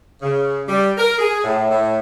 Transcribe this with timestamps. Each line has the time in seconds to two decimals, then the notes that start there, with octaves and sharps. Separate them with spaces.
0.22 C#3
0.68 G3
0.98 A#4
1.19 G#4
1.44 A2
1.70 A2